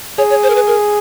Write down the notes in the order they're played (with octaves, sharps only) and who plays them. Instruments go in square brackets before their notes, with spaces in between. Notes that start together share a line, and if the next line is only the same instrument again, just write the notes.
[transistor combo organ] G#4 [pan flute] C#5
[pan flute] C#5
C5
A#4
B4
A#4